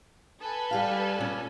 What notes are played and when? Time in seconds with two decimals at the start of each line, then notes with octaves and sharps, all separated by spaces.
0.41 A4 B4 G#5
0.71 G3 G4 F5
1.19 A#2 C#4